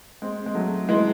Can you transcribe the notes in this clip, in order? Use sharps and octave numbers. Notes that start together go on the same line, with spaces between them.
G#3 C4
G#3
F#3 A3
E3 G#3